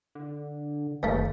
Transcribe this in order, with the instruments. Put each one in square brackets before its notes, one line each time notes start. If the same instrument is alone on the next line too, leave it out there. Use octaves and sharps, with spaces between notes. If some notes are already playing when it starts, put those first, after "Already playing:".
[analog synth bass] D3
[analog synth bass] F#1 [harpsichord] D#2 A3